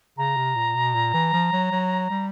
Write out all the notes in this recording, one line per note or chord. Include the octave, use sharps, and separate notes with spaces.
C#3 A#5
C3
A#2
B2
A#2
E3
F3
F#3
F#3
G3